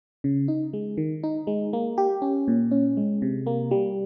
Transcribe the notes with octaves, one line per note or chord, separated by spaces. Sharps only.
C#3
D#4
G#3
D#3
D#4
G#3
A#3
G4
C#4
A#2
C#4
G#3
C3
A#3
G3